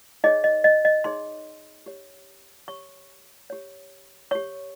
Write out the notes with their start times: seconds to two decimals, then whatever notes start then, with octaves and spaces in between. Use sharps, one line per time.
0.24 D#4 G#4 C#5 D#5
0.44 D#5
0.64 D#5
0.85 D#5
1.04 D#4 G#4 C#5 C6
1.86 G4 C#5
2.68 G4 C#5 C#6
3.50 G4 C#5
4.31 G4 C#5 C#6